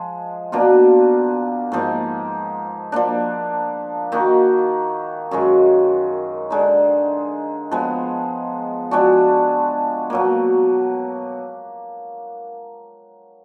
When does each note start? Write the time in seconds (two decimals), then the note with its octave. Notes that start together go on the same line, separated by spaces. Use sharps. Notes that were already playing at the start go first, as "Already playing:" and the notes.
Already playing: F3 G#3
0.52 B2 A#3 D4 F4
1.72 G#2 F3 A#3 D#4
2.92 F3 A#3 D4
4.12 D#3 A#3 D#4 F#4
5.31 F#2 D#3 G#3
6.50 D3 G#3 D#4
7.71 F3 G#3 B3
8.91 F3 G#3 D4 F#4
10.10 B2 F#3 A#3